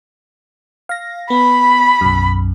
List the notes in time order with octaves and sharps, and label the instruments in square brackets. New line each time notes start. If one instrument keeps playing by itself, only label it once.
[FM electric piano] F5 A#6
[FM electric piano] B3 [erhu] B5
[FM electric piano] B1 F#2